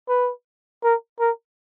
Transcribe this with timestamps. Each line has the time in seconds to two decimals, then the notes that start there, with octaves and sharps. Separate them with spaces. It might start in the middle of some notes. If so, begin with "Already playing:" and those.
0.09 B4
0.84 A#4
1.20 A#4